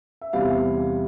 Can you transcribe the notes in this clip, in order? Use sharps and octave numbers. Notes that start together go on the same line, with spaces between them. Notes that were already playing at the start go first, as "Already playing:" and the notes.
E5
E2 C3 E3 G3 F5